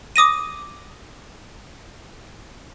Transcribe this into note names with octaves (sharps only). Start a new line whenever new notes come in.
D6 D#6 A#6 D#7